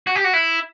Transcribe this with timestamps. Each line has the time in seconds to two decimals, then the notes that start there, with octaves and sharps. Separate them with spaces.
0.07 F#4
0.15 G4
0.24 F#4
0.34 E4